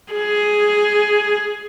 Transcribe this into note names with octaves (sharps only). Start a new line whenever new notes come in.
G#4